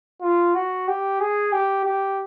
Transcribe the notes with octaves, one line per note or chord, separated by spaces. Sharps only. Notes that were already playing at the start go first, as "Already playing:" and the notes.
F4
F#4
G4
G#4
G4
G4